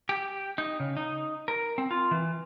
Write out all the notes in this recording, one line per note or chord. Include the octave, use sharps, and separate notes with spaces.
G4
D#4
C#3
D#4
A#4
C4
F4
E3